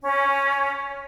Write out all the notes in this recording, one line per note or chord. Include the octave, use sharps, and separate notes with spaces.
C#4